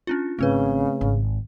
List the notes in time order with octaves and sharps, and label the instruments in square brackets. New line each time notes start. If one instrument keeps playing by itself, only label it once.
[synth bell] C#4 D4 F4
[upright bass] G#1 [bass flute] C#3 [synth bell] A3 C4 B4
[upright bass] G#1